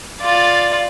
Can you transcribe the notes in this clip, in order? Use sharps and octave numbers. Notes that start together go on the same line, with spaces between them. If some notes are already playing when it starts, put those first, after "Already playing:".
F4 D5